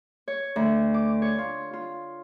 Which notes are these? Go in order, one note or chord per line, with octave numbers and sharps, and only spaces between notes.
C#5
D2
D6
C#5
F4
F4